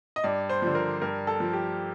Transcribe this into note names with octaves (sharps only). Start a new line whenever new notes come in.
D#5
G2 D5
C5
D3 F3
A#4
G2 A#4
A4
F3
G4